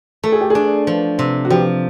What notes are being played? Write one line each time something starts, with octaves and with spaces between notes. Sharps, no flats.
A3 A4
G#4
G4
D4 G#4
F3
C3
F#4
F3 G4